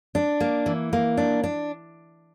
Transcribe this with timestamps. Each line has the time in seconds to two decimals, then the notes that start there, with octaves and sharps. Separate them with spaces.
0.15 D4
0.40 A#3
0.66 E3
0.93 A#3
1.17 D4
1.44 D4